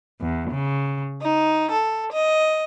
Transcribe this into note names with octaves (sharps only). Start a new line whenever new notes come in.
E2
C#3
D#4
A4
D#5